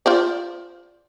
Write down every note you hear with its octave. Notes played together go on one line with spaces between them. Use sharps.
F4 C5 D5